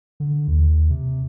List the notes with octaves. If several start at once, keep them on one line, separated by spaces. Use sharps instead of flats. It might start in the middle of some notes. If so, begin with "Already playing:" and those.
D3
D#2
C3